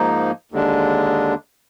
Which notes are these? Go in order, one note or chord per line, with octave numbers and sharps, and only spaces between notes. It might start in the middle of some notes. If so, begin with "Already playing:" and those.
Already playing: G#2 F3 A#3 D#4
D#2 D3 G#3 D4